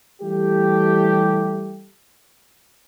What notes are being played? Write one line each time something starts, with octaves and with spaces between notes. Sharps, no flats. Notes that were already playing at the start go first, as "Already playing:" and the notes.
E3 G3 A3 G4